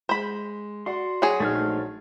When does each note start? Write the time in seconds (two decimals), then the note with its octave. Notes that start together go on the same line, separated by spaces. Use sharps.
0.09 G#3 C5 B5
0.86 F#4 D5 F#5 C6
1.22 F#3 G#4
1.40 A#1 A3 D#4 C5 F6 G#6